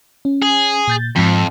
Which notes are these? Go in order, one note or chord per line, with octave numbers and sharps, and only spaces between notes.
C#4
G#4
A#2 G6 A6
F2 G#2 F3